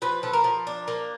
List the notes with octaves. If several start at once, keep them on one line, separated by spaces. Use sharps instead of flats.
F3 B4
F3 A4
A#4
F3
D4
A#3